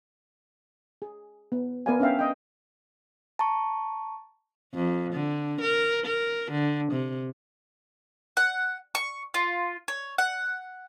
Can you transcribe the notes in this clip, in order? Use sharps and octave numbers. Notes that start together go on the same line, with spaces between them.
G#4
B3
B3 A#4 B4 D5 F5 G#5
C#4 D4 E5 F5 G5
D#5 G5
A5 A#5 C#6
F2
D3
A#4
A#4
D3
C3
F#5
C#6
F4
C#5
F#5